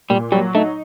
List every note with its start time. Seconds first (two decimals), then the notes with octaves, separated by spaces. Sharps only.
0.10 A#2 G3
0.32 F#3 G3
0.55 A3 D#4